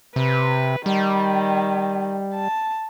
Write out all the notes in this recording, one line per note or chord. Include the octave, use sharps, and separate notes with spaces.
C3 B4
D#3 G3
A5